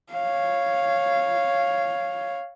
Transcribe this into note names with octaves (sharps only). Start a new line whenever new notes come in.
C#5 F5